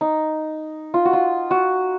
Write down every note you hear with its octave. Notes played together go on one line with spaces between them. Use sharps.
D#4
F4
F#4
F4
F#4